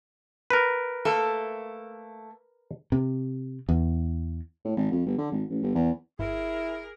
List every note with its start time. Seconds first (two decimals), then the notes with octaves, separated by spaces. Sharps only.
0.50 A#4 B4
1.05 A3 A#3 A4
2.92 C3
3.69 E2
4.65 A2
4.77 G#1
4.91 F2
5.06 G1
5.18 D3
5.32 G#1
5.50 A1
5.63 G1
5.75 E2
6.19 G1 E4 G#4 A#4